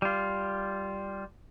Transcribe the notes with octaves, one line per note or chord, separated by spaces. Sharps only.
G3 F4